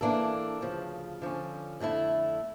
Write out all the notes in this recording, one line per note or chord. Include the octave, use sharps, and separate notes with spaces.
E3 A#3 D4 A4
D2 C#3 F3
D3 F3 C#4
F2 D3 A3 E4